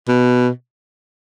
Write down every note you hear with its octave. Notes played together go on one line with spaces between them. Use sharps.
B2